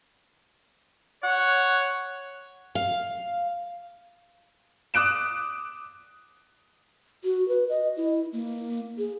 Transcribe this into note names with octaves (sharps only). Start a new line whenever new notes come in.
C#5 F#5
F5
D6 D#6 F#6 D7 E7
F#4
B4
D#5
E4
A#3
G#4